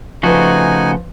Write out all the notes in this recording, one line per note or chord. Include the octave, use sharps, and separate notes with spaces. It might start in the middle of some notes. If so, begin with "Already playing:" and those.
C#3 F3 A3 D#4 F#4 B4 G#5